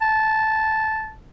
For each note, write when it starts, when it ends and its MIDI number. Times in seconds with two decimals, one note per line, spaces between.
0.01 1.12 81